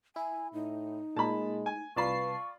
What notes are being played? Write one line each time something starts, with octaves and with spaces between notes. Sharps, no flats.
E4 G#5
A2 D#4
A#2 G#3 A5 B5
G#5
C2 F4 B4 D5 A5 B5 C#6 C7